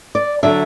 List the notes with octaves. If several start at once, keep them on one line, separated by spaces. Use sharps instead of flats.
D5
D3 F#3 D4 E5